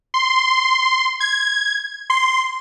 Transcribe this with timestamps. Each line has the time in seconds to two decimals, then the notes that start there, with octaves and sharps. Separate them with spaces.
0.14 C6
1.20 G#6
2.10 C6